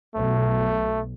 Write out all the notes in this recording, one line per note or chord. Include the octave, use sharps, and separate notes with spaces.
B1 A3